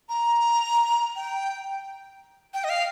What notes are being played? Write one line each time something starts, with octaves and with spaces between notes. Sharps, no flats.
A#5
G5
G5
D#5
F5